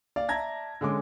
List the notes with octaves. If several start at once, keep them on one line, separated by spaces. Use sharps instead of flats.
D5 F5
D5 E5 A5 A#5 G#6 A#6
D3 G#3 C#4 D6